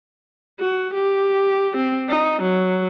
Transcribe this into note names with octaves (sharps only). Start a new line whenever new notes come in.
F#4
G4
C4
D#4
F#3